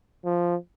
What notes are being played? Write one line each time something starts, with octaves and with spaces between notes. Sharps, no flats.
F3